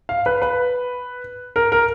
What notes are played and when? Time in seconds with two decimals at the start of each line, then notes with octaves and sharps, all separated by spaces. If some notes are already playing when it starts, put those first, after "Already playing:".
0.09 F5
0.26 B4
0.42 B4
1.56 A#4
1.72 A#4